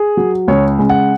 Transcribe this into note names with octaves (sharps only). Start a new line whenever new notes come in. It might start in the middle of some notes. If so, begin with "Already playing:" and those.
Already playing: G#4
F#3
C#2 C#5
C#3 G#3
F#5